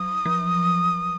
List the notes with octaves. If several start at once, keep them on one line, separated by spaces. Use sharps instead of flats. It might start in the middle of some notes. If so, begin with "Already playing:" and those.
Already playing: F#3 D#6
F3